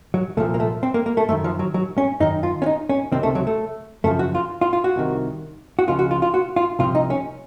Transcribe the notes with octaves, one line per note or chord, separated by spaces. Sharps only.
F#3
C2 A#2 F3 A3
A#3
A3
C4
A#3
A#3
A3
F#2 D#3 A3
F3
F#3
F#3
C#4
F#2 D#3 D#4
F4
C#4
D#4
C#4
C#2 C3 D#3 C4
A3
F#3
A3
F#2 C#3 F3 A3
F#4
F4
F4
F4
F#4
C2 C3 D#3
F#4
C#2 C#3 F3 F4
F#4
F4
F4
F#4
F4
C2 C3 F3 F4
D#4
C#4